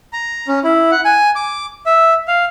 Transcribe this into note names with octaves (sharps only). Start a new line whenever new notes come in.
A#5
C#4
E4
F#5
G#5
D6
E5
F5